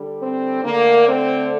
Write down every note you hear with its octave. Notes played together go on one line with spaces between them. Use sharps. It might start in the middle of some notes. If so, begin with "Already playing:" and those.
Already playing: D3 G3
C4
D3 A3 A#3
C4